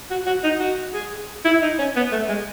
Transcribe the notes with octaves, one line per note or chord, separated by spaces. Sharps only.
F#4
F#4
D#4
F#4
G#4
E4
D#4
C#4
B3
A3
G#3